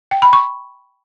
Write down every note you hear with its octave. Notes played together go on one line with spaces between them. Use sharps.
G5
B5
C#6